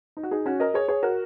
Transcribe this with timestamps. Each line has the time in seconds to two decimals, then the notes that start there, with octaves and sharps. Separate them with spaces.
0.17 D#4
0.23 F#4
0.31 D#4 G#4
0.46 C#4 F#4
0.60 A#4 D#5
0.74 G#4 C#5
0.88 G#4 C#5
1.03 F#4 A#4